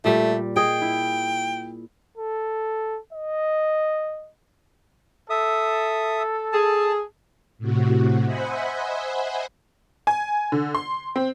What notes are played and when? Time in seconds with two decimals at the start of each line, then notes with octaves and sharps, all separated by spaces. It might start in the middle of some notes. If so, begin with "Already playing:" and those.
0.05 A#2 G3 A3
0.57 G#4 D#5 G5
0.82 E4
2.18 A4
3.13 D#5
5.30 A4 E5 D#6
6.53 G#4 A5
7.58 A2 C3 F#4
8.25 C5 D#5 E5 F#5 G#5 B5
10.07 G#5
10.52 D3
10.75 C6
11.16 C4